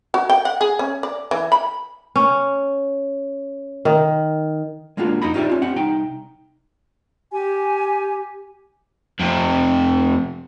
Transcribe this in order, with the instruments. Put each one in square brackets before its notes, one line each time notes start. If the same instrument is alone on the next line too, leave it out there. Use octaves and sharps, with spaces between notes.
[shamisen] F#4
G5
F#5
G#4
C#4
D5
E3
B5
[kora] C#4
D#3
[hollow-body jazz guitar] G#3 A#3 D4 F4 F#4
F2 D#4 A#5 B5
D#4 F4 G4 C#5 D5 E5
C#4 F4
C4 G4 F#5
C2 D#4 G5
[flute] G4 [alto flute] G#5
[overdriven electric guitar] F2 C3